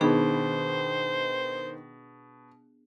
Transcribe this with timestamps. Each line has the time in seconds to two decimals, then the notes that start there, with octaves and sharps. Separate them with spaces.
0.01 B2 D#3 B3 D4 G#4 B4 C5